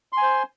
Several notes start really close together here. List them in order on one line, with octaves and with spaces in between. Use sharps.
C6 G#5 C5